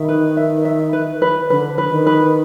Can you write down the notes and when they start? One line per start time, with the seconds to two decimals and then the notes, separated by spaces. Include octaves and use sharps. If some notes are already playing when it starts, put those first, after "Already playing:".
Already playing: D#3 E5
0.09 B4
0.37 E5
0.65 E5
0.93 B4
1.22 B4
1.50 D3 B4
1.78 B4
1.88 D#3
2.06 B4